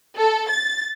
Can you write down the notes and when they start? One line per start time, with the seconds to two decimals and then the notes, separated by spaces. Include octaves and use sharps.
0.17 A4
0.50 A6